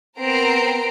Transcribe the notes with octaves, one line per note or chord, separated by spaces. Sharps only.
B3 C4 A#4 A#5 C7 D7